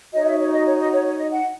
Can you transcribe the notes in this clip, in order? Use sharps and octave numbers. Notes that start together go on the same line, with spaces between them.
D#4 F#4 C#5 D#5
E5
C#5
D#5
C#5
D#5
C#5
C#5
D#5
F#5